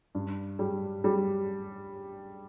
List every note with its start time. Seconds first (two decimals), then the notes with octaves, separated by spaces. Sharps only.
0.15 G2
0.59 G3
1.04 G3